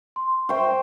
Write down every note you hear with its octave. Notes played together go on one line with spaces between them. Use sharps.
C6
C5 E5 G5 C#6